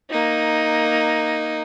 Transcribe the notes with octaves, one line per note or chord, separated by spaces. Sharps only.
A#3 D#4